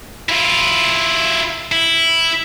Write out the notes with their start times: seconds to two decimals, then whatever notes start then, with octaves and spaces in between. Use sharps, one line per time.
0.29 E4 F4
1.72 E4